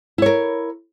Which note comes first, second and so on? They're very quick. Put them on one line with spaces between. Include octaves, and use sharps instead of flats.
E4 C#5 A#4